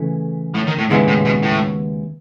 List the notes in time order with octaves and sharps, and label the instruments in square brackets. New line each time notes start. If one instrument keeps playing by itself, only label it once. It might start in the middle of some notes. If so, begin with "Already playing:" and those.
Already playing: [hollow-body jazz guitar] C#3 E3 A3
[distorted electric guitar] A2
D#3
A2
[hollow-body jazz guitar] D#2 C#3 G#3 B3 E4 [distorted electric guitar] G#2
[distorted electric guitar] A2
B2
A2